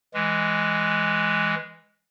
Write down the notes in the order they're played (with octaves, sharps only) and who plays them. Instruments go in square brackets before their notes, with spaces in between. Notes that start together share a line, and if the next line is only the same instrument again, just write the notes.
[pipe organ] E3 G#3